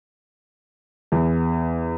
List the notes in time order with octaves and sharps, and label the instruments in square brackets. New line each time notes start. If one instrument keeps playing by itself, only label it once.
[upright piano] E2